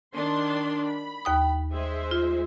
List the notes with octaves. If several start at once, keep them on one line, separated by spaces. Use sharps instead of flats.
D#3 D4 C6
B5
D#2 G5 D#6
G#3 C5 E5
F4